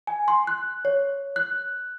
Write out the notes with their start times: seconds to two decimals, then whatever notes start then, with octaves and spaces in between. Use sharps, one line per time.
0.07 G#5
0.28 C6
0.47 F#6
0.85 C#5
1.36 F#6